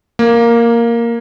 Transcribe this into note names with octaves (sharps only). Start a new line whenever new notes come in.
A#3